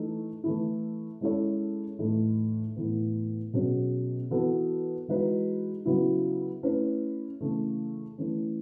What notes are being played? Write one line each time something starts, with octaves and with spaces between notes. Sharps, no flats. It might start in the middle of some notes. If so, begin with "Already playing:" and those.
Already playing: E3 A3 D#4 A4
E3 A3 E4
G#3 C#4 E4 A4 C#5
A2 E3 A3 D#4
A2 E3 B3
B2 F#3 C#4 G#4
E3 B3 F#4 A4
E3 G#3 D#4 F#4 B4
C#3 F#3 B3 E4
A3 C#4 E4 B4
C#3 E3 A3
E3 A3 C#4